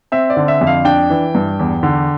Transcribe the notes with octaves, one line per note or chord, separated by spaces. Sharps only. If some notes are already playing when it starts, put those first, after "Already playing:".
C4 E5
D5
D3
E5
F2
F5
D4 G5
E3
G2
E2
D3